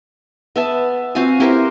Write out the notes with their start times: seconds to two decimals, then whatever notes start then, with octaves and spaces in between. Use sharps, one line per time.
0.56 B3 E5 A5
1.15 C4 F4 F#4 F5 G#5
1.40 C4 E4 G4 A#4 C5 E5